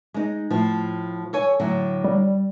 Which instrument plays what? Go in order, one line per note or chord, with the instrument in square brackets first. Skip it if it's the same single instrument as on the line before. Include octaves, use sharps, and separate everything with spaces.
[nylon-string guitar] G#3 D#4
A2 F3
A4 C#5 G#5
A2 D3 F#3
[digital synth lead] G3